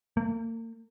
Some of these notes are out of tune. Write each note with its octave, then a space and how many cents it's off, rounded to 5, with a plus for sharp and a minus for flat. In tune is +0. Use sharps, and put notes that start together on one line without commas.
A#3 -40